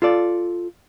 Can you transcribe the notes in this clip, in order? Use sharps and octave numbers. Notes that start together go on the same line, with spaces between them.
F4 A4 D5